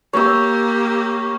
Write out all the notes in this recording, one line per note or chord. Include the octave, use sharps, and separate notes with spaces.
A#3 G4 C#5 E6